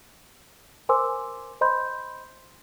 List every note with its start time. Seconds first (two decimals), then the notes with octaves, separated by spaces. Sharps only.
0.89 A#4 C5 G#5 C6 D6 E6
1.61 C5 D#5 B5 C6 G6